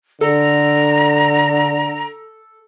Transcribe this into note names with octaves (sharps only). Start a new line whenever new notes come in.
D3 A4 A#5